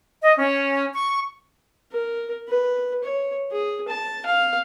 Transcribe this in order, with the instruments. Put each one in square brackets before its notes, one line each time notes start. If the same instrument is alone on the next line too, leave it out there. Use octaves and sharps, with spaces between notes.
[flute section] D#5
C#4
C#6
[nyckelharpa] A#4
B4
C#5
G#4
A5
F5